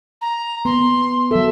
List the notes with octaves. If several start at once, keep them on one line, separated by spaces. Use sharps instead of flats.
A#5
B3 C6
F#3 A4 E5